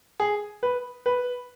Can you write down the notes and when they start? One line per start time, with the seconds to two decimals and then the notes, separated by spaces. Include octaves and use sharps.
0.20 G#4
0.63 B4
1.06 B4